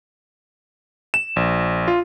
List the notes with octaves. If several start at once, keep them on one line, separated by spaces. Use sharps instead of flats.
E7
A#1
F4